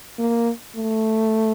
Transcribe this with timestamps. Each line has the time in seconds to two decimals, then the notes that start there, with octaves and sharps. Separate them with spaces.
0.19 A#3
0.77 A3